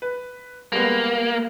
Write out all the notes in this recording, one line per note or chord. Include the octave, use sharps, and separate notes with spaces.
B4
G3 G#3 A#3 B3